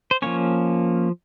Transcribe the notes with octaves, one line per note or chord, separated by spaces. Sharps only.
C5
F3 A#3 C#4 C#5